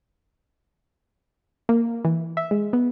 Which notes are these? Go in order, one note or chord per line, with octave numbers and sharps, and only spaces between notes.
A#3
E3
E5
G#3
B3